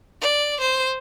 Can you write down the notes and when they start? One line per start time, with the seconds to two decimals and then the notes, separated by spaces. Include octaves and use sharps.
0.21 D5
0.60 C5